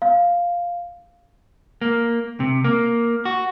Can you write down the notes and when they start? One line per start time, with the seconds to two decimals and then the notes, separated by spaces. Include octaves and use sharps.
0.02 F5
1.81 A#3
2.40 C3
2.64 A#3
3.25 F#4